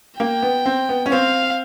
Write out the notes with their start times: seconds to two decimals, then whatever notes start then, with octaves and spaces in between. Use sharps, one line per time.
0.20 A#3 G5
0.42 B3
0.66 C4
0.89 B3
1.06 C#4
1.11 C4 F5